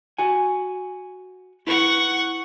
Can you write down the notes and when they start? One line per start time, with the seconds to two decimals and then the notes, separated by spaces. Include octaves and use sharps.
0.18 F#4 G#5
1.67 E4 B4 F#5 C#6